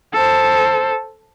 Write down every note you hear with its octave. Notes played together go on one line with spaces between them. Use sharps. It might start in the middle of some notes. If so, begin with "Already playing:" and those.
A4 C5